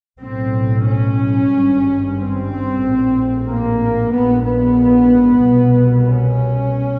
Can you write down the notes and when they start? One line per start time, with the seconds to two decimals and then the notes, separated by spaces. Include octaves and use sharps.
0.19 B1 A2 C4
0.85 C#4
1.50 G#1 G2
2.16 C4
2.80 A#1 A2
3.46 A#3
4.11 A#1 G#2 B3
4.44 B3
5.41 C2 B2
6.07 C#4